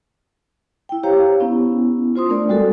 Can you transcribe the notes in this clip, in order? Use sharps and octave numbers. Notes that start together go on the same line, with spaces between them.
E4 G5
G4 C5 C#5 F5 A#5
B3 C#4 E4
F4 C5 C6 D#6
A3 C4 D4 A#4 D5
G3 G#3 F#4 A4